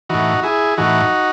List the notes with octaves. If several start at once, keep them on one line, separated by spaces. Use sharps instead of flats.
A2 E3 D#4 F#4
E4 G#4
A2 E3 D#4 F#4